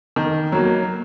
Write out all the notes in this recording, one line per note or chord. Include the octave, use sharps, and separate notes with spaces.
D#3
F#3 A#3